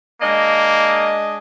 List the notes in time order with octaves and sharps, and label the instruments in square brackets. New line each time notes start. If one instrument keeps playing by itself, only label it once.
[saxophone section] G#3 D4 D#5 [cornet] A#3